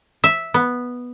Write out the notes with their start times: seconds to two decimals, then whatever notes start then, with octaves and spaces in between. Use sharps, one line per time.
0.24 E5
0.54 B3